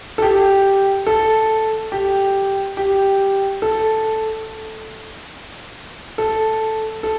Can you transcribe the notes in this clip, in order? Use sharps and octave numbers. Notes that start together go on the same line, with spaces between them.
A4
G4
A4
G4
G4
A4
A4
A4